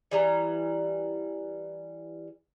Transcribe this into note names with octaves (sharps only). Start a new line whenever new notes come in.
E3 G3 A#5